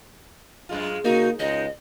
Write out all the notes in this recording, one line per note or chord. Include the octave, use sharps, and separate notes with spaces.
F#2 G#3 F4
C#3 A#3 D#4 F#4
C#2 G#3 D#4 D#5